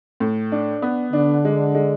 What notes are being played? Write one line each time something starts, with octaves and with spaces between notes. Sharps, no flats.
A2
D4
B3
D3 D4
G#3
G#3